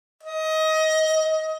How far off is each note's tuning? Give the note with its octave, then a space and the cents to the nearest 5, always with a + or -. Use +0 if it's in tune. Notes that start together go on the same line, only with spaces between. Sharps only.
D#5 +20